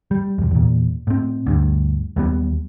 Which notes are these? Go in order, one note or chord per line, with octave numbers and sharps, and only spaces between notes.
G3
E1 E2
E2 A#2
A2 C4
D2 G2
D#2 F#3 G3 B3